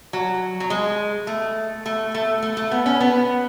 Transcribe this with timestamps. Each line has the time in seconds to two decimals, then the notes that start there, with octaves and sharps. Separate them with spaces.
0.13 F#3
0.60 F#3
0.70 G#3
1.27 A3
1.86 A3
2.14 A3
2.43 A3
2.57 A3
2.71 B3
2.86 C#4
3.00 B3